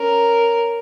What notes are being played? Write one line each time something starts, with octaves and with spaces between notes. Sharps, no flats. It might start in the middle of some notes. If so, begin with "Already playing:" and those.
Already playing: C#4 A#4